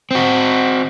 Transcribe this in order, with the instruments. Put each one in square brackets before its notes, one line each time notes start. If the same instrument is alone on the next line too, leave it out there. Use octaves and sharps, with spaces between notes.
[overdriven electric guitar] C4 F#4